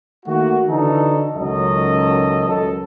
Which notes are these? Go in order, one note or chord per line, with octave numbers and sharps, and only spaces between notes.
D#3 A3 A#3 F#4
D3 E3 D4 D#4 F#4 A4
C#2 F#2 D#3 F#3 A4 D#5
C#2 F#2 A4